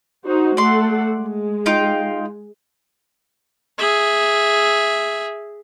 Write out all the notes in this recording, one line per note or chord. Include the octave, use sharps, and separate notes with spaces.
D#4 F#4 C5
A3 A4 D5 F#5 C6
G#3
D#4 F4 G5
G#4 E5